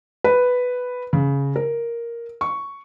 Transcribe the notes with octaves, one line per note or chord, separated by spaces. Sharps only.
B4
C#3
A#4
C#6